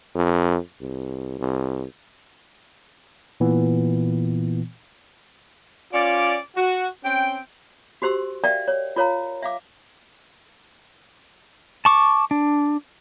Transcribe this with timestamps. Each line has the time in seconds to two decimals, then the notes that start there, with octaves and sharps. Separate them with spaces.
0.15 F2
0.81 C2
1.39 C2
3.40 A#2 E3 B3
5.93 C#4 F4 D5
6.57 F#4
7.04 C4 C#4 G5
8.02 F#4 G4 C5 C6 E6
8.44 A#4 D5 E5 F5 G5
8.68 C#5
8.96 F4 A#4 C#5 F5 A#5
9.43 E5 F5 D6
11.85 A5 C#6 D6
12.31 D4